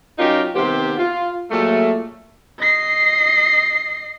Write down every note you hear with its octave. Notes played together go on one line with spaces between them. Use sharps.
F#3 C#4 D#4 F4 G4 A#4
C3 D#3 B3 G4 C5
F4
A#2 F#3 G#3 A3
D#5 C7